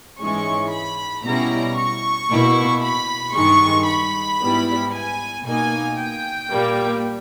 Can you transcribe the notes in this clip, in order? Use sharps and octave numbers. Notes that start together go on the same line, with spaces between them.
G#2 E3 G#3 C#4 C#6
B5
B2 G3 C#4 E4 A#5
C#6
B2 A#3 E4
B5
G2 D#3 G#3 C#6
B5
G#2 G3 B3 E4
G#5
B2 A#3 D#4 G#5
G5
A#2 G3 A#3